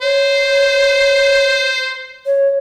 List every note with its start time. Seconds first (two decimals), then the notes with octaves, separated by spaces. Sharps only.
0.02 C5 C#5
2.26 C#5